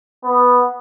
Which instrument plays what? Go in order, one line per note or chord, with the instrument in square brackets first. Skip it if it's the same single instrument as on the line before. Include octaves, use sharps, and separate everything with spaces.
[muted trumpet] B3